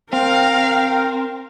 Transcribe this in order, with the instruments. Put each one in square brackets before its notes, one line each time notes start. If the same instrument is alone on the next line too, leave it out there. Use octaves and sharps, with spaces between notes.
[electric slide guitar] C4 [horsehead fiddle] A#4 G5 [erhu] F5